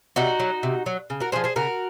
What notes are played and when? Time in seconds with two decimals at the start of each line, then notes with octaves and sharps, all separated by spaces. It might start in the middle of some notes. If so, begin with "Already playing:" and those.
0.16 C3 D#4 F#4
0.40 F#3
0.63 C3
0.86 F#3
1.10 C#3
1.20 F#4 A#4
1.32 F3 G#3 G#4 C5
1.44 G#4 C5
1.56 C#3 F#4 A#4